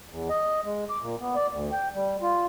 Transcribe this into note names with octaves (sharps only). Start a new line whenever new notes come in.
E2
D#5
G#3
D6
A#2
B3
D5
D2
G5
G3
F4